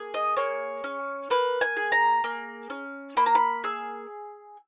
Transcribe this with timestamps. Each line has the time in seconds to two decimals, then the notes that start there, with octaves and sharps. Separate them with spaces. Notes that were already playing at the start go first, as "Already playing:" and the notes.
Already playing: A#3 G#4
0.14 D#5
0.37 A#3 C#5
0.84 C#4
1.30 A#3 B4
1.61 G#5
1.77 G#4
1.92 A#5
2.24 A#3
2.70 C#4
3.17 A#3 B5
3.26 A#5
3.35 B5
3.64 G#4 E6